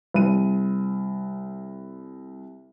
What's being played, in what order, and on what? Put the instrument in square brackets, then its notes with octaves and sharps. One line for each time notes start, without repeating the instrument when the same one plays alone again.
[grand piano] C2 D#7